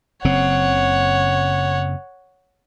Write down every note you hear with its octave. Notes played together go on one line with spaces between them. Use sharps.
F#1 C#3 C4 C#5 F#5